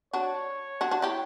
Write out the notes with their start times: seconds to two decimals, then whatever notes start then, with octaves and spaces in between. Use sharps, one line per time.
0.13 D4 F#4 C#5
0.81 D4 F#4
0.91 D4 F#4
1.02 E4 G4